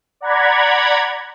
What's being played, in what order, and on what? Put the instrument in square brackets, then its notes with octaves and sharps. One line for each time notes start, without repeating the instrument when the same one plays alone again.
[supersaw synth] D5 F#5 A#5 B5 G#6